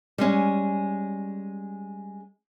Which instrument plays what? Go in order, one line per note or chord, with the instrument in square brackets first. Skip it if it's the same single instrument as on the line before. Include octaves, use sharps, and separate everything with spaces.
[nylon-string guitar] G3 G#3 C#4